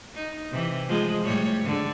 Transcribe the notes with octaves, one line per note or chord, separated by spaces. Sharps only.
D#4
C3 E3
F3 G#3 F4
A2 G3 C#5
G#2 D3